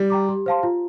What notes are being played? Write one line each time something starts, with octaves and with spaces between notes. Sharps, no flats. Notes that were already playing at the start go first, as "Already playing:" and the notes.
Already playing: G3
G5 A#5 D6
G4
C5 F5 A5 C6
F4